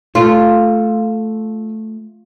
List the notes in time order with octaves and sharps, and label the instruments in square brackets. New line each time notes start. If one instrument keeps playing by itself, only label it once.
[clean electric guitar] A3 [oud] F4